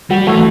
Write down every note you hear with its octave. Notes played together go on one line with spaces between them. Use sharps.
G3 F#4
E3 A3